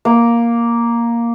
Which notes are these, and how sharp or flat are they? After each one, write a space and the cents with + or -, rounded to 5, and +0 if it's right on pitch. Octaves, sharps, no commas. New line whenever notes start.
A#3 +5